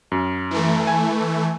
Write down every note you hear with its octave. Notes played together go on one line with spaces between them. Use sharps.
F#2
E3 A3
G#5